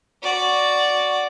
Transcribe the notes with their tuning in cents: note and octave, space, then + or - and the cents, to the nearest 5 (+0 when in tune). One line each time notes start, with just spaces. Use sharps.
F#4 +0 D5 +0